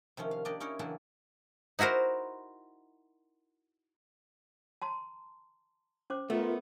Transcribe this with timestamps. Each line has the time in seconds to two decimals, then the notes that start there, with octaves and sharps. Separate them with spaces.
0.17 C3 D#3 F3 C#4
0.31 F5
0.45 A#3 D4 G4 D5 D#5
0.60 C#4 D#4 E4 A#4 C#5
0.79 C#3 E3 F#3 D4 E4 G4
1.79 D#4 E4 F#4 A#4 C5
4.82 A5 A#5 C6
6.10 C#4 C5 D6
6.30 A3 B3 F4 A#4 E5